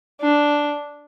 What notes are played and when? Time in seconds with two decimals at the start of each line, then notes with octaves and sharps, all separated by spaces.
0.21 D4